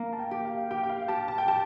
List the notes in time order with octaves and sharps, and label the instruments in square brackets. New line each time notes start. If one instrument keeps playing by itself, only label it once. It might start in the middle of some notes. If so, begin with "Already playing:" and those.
Already playing: [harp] A#3
[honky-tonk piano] A5
G5
[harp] G4
[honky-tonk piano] F5
[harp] G4 [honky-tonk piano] G5
[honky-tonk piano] G5
F5
[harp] G4 [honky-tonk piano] A5
[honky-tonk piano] A5
G5
[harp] G4 [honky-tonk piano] A5